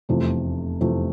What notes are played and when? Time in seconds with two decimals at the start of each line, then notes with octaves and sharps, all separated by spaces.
0.09 F1 E2 C3 F3 A3
0.80 F1 E2 C3 F3 A3